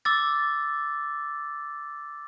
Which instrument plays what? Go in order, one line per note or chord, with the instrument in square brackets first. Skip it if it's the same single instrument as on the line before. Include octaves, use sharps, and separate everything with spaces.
[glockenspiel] D6 E6 A6